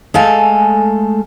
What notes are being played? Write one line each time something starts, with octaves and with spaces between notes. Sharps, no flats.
G#3 A3 A4 F5 G#5